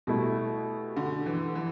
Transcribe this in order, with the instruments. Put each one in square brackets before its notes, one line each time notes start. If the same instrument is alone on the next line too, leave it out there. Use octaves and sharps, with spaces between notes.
[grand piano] B2 A3 E4 [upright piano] G3
[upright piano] D3
E3
E3